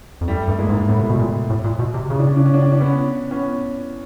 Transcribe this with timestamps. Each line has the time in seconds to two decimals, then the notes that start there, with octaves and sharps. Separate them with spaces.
0.21 F2
0.28 F#2 G3 A3
0.48 G2
0.58 G#3 A#3
0.69 G#2
0.88 A2 A3 B3
1.00 C3
1.10 B2
1.19 A#2
1.50 A2
1.64 A#2
1.79 B2
1.94 C3
2.10 C#3 C#4
2.19 D4
2.27 C#4
2.36 D4
2.46 C#4
2.54 D4
2.63 C#4
2.72 D4
2.80 B3 C#4
3.31 B3 C#4